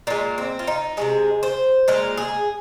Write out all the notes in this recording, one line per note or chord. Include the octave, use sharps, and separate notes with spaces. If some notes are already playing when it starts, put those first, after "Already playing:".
A#2 G#3 A#3
C4
F4
D#4
C3 D#3 G#3 G#4
C5
A#2 G#3 A#4
G#4